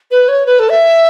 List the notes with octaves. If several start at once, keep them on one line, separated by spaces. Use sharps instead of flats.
B4
C#5
B4
A4
E5